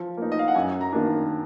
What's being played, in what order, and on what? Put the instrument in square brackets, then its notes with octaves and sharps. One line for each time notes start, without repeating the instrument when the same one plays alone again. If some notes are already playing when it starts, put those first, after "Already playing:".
Already playing: [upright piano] F3
A#3 D#4
[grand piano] D#5
F5
F#5
[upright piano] F#2 [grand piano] G#5
[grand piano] A#5
[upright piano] D#3 A#3 D4